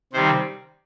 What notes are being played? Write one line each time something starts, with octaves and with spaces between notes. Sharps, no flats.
C3 D#3 G3 C4 C5